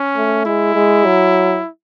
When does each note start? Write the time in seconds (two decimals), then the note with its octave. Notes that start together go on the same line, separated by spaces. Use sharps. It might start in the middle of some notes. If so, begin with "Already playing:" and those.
Already playing: C#4
0.17 A3
0.46 G#3 E4
0.76 G#3
1.05 F#3